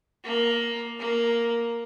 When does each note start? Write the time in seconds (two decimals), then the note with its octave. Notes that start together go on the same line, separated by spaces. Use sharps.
0.24 A#3
0.99 A#3